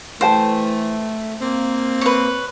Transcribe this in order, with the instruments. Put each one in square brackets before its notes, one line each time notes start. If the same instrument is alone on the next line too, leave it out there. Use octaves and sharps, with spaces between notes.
[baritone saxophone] E3 [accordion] A3 [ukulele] B4 G5 A5 [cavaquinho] C5
[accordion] A#3 [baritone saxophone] C4
[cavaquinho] B4 C#5